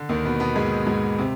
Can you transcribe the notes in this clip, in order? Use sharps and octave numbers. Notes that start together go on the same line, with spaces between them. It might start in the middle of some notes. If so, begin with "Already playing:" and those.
Already playing: D3
D#2 D#3
B2 B3
B2 B3
G#2 G#3
G#2 G#3
C3 C4